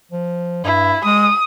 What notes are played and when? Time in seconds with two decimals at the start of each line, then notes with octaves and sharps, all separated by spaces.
0.12 F3
0.65 G2 E4
1.05 G#3 D#6